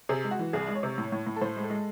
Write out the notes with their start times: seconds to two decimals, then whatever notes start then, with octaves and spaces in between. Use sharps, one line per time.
0.09 C3 G#4
0.24 G#3
0.31 F#4
0.39 E3
0.53 C2 G#4
0.68 G#3
0.75 C#5
0.83 C3
0.98 A2
1.12 A2
1.27 A2
1.36 A4
1.41 A2 C5
1.56 G#3
1.63 A4
1.70 G#3